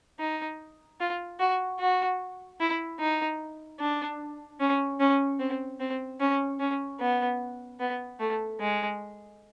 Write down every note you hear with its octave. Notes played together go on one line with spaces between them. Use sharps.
D#4
F4
F#4
F#4
E4
D#4
D4
C#4
C#4
C4
C4
C#4
C#4
B3
B3
A3
G#3